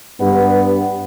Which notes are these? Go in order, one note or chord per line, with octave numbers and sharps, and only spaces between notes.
G2 B3